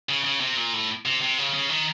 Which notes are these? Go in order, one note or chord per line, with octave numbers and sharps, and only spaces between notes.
C#3
C#3
C3
A#2
A2
C3
C3
C#3
C#3
D#3